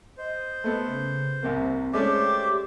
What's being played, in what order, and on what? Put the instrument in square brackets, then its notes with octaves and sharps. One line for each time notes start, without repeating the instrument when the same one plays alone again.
[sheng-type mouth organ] C5 [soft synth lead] D#5
[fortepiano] A3 B3 A4 [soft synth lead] D#5
[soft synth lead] C#3
[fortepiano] C2 C3 A#3 [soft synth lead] C4
[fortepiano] G#3 A3 C#4 [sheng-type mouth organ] C5 D5 E5 [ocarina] D6
[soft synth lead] G4